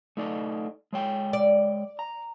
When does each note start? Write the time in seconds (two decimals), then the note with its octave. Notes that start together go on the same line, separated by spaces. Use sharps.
0.17 A3 D#4 D5
0.93 G#3 C#5 G5
1.33 D5
1.99 A#5